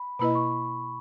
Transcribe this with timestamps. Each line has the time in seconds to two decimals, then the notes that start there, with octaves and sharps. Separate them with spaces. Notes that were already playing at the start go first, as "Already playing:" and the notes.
Already playing: B5
0.19 B2 A#3 E4 B4 D#5 B5
0.35 C#6